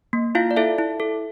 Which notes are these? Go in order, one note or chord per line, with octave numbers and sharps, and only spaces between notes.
A#3
E4 F4 F5
D5
E4 A4 E5
E4
A4